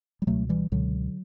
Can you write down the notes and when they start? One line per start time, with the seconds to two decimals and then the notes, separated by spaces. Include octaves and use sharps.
0.22 G3
0.27 C#2 B2 F#3 A3
0.49 E3 G3
0.72 C#2 B2 D3 F#3